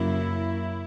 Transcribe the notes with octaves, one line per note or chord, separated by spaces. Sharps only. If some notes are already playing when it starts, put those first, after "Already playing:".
Already playing: F#2 C#3 F#3 A#3 E4